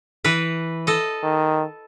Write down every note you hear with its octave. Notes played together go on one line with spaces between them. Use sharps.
E3 B4
A4 D#5
D#3